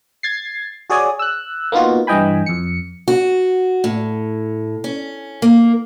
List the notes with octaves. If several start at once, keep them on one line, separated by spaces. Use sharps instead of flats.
G#6 A6 C7
F#4 G#4 C#5 D5 G#5 D#6
E6 F#6
A#3 B3 D#4 F4 F#4
G2 E3 D#5 G5 G#5 B5
F2 C#7
F#4
A2
C#4
A#3